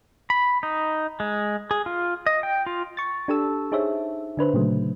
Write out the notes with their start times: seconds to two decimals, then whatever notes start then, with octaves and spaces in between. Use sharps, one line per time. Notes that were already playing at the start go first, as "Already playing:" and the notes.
0.30 B5
0.63 D#4
1.20 G#3
1.71 G#4
1.86 F4
2.26 D#5
2.43 G5
2.66 F4
2.97 C#6 A6
3.28 D4 G4 A4 A5 E6
3.72 D#4 G#4 C5 C#5 E5
4.37 D3 D4 B4 C5
4.54 A#2 C#3 F#3 A3